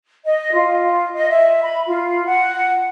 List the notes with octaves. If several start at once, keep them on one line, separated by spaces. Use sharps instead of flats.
D#5
F4
D#5
E5
B5
F4
F#5